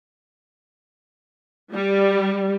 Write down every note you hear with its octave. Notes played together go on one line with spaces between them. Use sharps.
G3